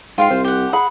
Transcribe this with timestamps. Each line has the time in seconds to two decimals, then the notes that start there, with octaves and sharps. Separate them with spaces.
0.18 G#2 F4 F5 G5 C6
0.30 C2 C5
0.45 G4 F#5
0.73 G#4 F#5 B5